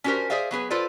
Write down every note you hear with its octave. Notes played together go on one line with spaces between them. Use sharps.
C#4 D4 F#4 G4 A#4 C5
G#4 C5 D5 E5 F5
F#3 B3 G#4 B4
F4 A4 B4 C5 D5